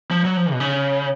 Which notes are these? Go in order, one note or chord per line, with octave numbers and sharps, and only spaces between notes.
F3
F#3
F3
B2
C#3